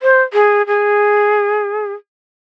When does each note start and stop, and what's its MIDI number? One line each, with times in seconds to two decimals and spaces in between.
0.02 0.22 72
0.33 0.66 68
0.67 1.93 68